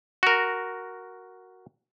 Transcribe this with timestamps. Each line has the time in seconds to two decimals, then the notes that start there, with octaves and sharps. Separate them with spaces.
0.23 F#4 A#4